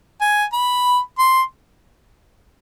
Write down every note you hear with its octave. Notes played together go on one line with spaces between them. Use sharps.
G#5
B5
C6